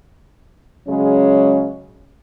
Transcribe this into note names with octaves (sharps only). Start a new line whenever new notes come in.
C#3 F#3 G#3 C#4